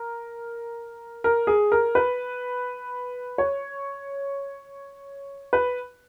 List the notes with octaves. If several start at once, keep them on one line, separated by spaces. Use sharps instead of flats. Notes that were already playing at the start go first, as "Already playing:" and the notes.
Already playing: A#4
A#4
G#4
A#4
B4
C#5
B4